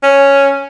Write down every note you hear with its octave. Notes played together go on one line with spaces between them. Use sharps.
C#4